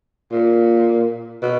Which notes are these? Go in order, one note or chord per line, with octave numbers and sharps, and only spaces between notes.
A#2
B2